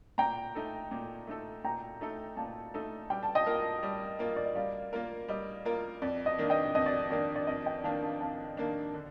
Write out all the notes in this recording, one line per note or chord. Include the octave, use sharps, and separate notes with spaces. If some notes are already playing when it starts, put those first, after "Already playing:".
A#2 G5 A#5
A3 D#4 A4
A#2
A3 D#4 A4
A#2 G5 A#5
A3 D#4 A4
A#2 F5 A5
A3 D#4 A4
G3 G5
A5
D#5 G5
A#3 F4 A#4
G3
A#3 F4 A#4
D5
D#5
G3 D5 F5
A#3 F4 A#4
G3 D#5
A#3 F4 A#4
F2 D5
D#5
D#3 A#3 D4
D#5 G5
F2 D#5
D5
D#3 A#3 D4 D5
D5
F2 D#5
D#5 G5
D#3 A#3 D4 F5 A5
F5 A5
F2 F5 A5
D#3 A#3 D4
D3